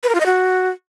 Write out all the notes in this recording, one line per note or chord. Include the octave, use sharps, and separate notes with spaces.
B4
A#4
F4
D#5
F#4